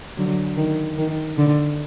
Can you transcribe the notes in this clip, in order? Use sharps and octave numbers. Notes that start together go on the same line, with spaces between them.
D3 F#3
D#3
D#3
D3